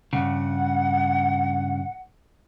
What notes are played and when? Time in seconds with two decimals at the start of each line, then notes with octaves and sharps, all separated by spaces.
0.13 G2 C#3 F#5